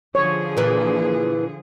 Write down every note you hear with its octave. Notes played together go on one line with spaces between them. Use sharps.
D3 F3 G#4 C#5
A#2 E3